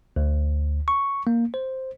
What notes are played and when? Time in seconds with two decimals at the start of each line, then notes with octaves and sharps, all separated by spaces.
0.16 D2
0.88 C#6
1.27 A#3
1.54 C5